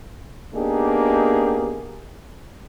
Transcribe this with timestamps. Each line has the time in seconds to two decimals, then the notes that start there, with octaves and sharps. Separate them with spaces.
0.55 A#3 B3 D4 D#4 G4 G#4